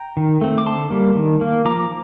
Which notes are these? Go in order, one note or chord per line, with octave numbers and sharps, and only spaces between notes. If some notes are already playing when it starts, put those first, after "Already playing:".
Already playing: G5 A#5
D#3
A3 C4
D6
D3 A5 C6
G3 A#3
D#3
A#3
F3 A#5 D6